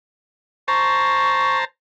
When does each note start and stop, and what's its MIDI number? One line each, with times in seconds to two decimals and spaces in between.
0.68 1.65 72
0.68 1.65 81
0.68 1.65 82
0.68 1.58 85